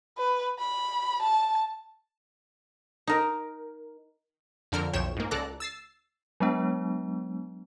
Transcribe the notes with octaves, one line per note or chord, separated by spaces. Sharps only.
B4
B5
A5
D#4 A#4
F2 D3 A#4 F6
B1 F2 C#5 G5 E7
G#2 A#3
C#2 A4 D5 A#5 F#6 A#6
E6 A6 C7
F#3 G#3 B3 D4